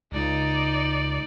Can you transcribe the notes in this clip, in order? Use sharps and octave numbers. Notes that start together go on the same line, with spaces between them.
C#2 D#4 D5